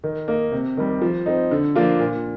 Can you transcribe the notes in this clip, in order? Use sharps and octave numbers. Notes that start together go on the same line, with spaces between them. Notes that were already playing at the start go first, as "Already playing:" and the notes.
D#3
A#3 D#4
C3
D#3 G3
F3
C4 D#4
D3
F3 A#3 D4 F4
A#2